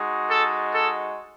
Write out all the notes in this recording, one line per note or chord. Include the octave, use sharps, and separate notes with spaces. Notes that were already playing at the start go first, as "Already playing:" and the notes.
Already playing: G#3 D#4 F#4
A4
A4